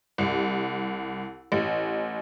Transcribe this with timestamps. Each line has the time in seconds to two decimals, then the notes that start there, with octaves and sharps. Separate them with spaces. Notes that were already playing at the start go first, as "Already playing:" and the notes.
0.18 C2
1.52 A1